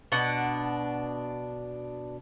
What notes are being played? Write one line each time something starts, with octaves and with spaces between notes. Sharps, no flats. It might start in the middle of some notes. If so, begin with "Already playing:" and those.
B2 D4 F#5